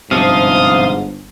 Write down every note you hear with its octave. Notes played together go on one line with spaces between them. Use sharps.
G1 G#2 C3 F3 F5 D#6